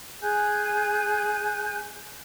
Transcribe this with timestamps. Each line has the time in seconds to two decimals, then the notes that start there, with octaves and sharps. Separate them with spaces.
0.22 G#4 G#5 F#6 G6